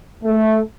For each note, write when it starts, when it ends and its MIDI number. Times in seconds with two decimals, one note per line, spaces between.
0.24 0.59 57